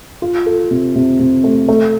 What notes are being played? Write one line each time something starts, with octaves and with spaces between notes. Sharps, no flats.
F4
A4
C3
C3
C3
A3
A3